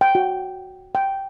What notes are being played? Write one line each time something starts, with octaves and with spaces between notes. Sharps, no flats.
G5
F#4
G5